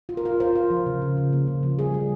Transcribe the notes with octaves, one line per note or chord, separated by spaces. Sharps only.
F4
A#4
F4
F4 C5
F4
F3
C#3
C#3
C#3
A#3
C#3
F3
G3 G#4
G3